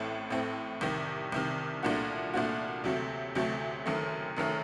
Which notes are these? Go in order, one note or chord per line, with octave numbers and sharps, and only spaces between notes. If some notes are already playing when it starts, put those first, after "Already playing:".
Already playing: A1 A2 A3 C4
A1 A2 A3 C4
C2 C3 D#3
C2 C3 D#3
C2 A#2 A3 D4 F#4
C2 A#2 A3 D4 F#4
D2 C3 F#3 A3
D2 C3 F#3 A3
F#1 F#2 D#3 A3
F#1 F#2 D#3 A3